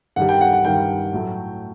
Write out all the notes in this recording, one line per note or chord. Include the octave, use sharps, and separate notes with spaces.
G2 D#3 G3 F#5
G5
F#5
F#5
G2 D#3 G3 G5
A2 F#3 A3